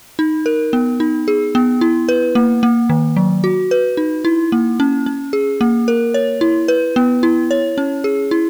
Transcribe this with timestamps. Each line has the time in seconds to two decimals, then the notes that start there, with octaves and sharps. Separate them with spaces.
0.19 D#4
0.46 A#4
0.73 B3
1.00 D#4
1.28 G#4
1.55 B3
1.81 E4
2.09 B4
2.35 A#3
2.63 A#3
2.89 D#3
3.16 F#3
3.44 F#4
3.71 B4
3.97 D#4
4.25 E4
4.52 A#3
4.80 C#4
5.06 C#4
5.33 G#4
5.61 A#3
5.88 A#4
6.14 C#5
6.41 E4
6.68 B4
6.96 B3
7.23 E4
7.51 C#5
7.78 C#4
8.04 G#4
8.31 E4